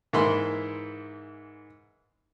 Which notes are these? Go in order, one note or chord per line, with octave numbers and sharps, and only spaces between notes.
G#2 E3 A#3 E4 B5 C6